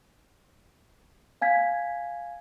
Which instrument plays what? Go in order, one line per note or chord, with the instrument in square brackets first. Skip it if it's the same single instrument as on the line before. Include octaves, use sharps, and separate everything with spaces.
[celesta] F5 G#5 G#6 B6